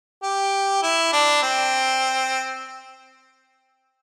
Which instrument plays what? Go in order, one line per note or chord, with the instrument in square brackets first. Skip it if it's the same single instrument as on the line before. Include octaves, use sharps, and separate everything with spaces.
[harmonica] G4
E4
D4
C4